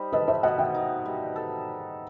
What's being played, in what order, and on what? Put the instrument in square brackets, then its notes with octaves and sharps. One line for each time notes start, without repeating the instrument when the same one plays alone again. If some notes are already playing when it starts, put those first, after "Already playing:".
Already playing: [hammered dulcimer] G3 D#4 [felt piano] C5
[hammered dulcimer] A4 [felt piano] B4 D#5
[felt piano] C5 E5
[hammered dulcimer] B2 [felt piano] D#5 F#5
[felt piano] E5 G5
[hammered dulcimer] D#4
G3
A4